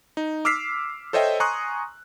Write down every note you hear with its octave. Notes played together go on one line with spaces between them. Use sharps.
D#4
D6 E6 F6 B6 C7
A4 C5 C#5 D#5 E5 G5
G#5 A#5 C6 C#6 D#6 F#6